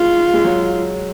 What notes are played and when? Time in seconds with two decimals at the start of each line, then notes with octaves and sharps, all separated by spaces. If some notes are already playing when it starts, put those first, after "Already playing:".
Already playing: G#3 F4
0.33 G#3
0.45 F#3